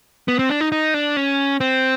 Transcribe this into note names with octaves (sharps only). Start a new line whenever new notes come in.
B3
C4
D4
D#4
D#4
D4
C#4
C4